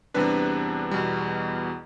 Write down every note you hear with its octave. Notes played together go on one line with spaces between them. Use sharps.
E2 C3 G3 D4 B4
E2 B2 G3